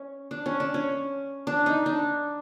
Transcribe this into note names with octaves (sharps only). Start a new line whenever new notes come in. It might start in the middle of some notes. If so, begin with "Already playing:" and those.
Already playing: C#4
D4
C#4
D4
C#4
D4
D#4
D4